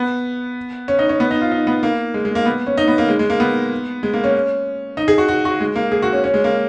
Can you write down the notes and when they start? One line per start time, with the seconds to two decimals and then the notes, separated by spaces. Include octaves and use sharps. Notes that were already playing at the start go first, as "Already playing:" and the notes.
Already playing: B3
0.88 C#4
0.99 D#4
1.09 C#4
1.20 B3
1.31 D#4
1.41 F4
1.52 D#4
1.67 B3
1.83 A#3
2.14 G#3
2.25 G#3
2.35 A#3
2.46 B3
2.67 C#4
2.78 D#4
2.88 B3
2.98 A#3
3.08 G#3
3.19 G#3
3.30 A#3
3.40 B3
4.03 G#3
4.13 A#3
4.24 C#4
4.97 D#4
5.08 G#4
5.18 F#4
5.28 F#4
5.45 F#4
5.60 G#3
5.76 A#3
5.92 G#4
6.02 F#4
6.13 C#4
6.24 C#4
6.34 G#3
6.44 A#3